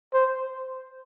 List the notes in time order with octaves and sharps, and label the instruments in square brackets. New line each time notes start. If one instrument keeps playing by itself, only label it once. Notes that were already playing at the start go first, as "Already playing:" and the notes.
[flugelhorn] C5